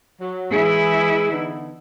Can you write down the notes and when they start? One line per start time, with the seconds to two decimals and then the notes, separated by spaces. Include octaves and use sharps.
0.20 F#3
0.52 E3 G#3 E4 G#4
1.31 D3 B3 D#4